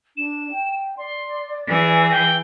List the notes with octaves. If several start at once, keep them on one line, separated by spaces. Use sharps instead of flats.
D4 E7
G5
D5 C6
E3 G#4 A6
G5